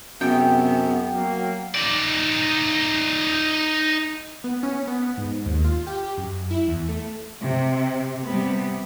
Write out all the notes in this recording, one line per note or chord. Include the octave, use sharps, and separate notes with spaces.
F#2 C3 B3 G#4 E5 G5
F#3 A#3
D#4 D5
B3
C#4
B3
G#2
D#2
F4
G4
F#2
E4
E2
A3
C3
C3 G3 B3